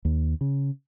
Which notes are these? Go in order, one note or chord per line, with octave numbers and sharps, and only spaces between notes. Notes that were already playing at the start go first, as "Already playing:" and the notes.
D#2
C#3